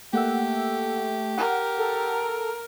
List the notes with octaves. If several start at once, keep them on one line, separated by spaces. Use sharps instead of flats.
A3 A#3 G4 F#5 E6
A#4 F#5
A4